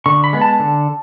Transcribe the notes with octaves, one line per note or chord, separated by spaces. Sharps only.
D3 C#6
B5
G#3 B3
A5
D3